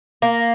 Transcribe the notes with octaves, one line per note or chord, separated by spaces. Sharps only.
A#3